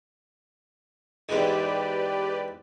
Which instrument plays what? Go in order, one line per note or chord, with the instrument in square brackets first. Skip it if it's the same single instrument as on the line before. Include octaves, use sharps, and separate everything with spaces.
[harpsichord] E2 G#2 [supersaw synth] G4 B4 D5